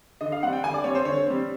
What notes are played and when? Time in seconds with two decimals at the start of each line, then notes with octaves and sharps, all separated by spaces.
0.21 D3 D#5
0.32 F5
0.42 G3 C4 F#5
0.53 G5
0.63 D3 G#5
0.74 D5
0.84 G3 C4 C#5
0.95 C5
1.05 D3 C#5
1.27 G3 C4